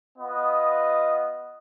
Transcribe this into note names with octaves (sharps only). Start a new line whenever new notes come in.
B3 F4 B4 D#5